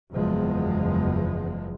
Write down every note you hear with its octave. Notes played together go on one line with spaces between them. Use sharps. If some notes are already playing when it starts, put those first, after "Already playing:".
F#1 E2 F3 G#3